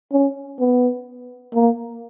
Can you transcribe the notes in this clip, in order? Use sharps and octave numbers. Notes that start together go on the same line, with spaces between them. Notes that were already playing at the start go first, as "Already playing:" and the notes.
C#4
B3
A#3